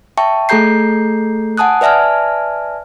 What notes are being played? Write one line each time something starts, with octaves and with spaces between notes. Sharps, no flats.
E5 G5 A5 C#6
A3 G#4 A4 A#5 G6 C7
F#5 G#5 A5 D#6 F#6
B4 D5 E5 G#5 A5 F6